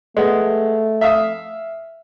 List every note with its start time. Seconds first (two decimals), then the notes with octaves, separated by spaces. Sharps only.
0.17 G#3 A3 B3
1.01 E5 F5 D#6